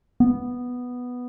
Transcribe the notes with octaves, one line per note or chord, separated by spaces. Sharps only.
B3